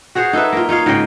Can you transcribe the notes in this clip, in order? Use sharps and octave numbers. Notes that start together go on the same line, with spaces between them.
F#4 G#4 C5 C#5
D#4 A4 B4 E5
A#3 F4
D#4 F4 C#5 F5
G#2 C#3 D#5 G5